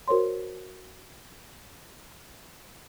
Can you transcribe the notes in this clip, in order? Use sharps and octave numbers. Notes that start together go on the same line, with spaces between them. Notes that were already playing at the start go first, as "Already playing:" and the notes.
F#4 A#4 C5 C#5 C6